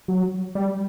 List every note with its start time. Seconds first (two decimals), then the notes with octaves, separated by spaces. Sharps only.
0.08 F#3
0.55 G3